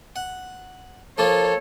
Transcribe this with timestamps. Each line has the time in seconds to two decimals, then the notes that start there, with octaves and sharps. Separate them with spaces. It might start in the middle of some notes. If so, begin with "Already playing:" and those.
0.16 F#5
1.18 F3 A#3 F4 A4 C#5